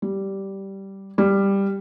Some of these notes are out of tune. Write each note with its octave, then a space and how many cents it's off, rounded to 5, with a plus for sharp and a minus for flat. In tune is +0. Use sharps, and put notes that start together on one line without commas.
G3 -10
G3 +10